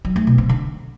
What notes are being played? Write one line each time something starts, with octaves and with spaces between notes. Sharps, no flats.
F#3
A3
B2
C4
D3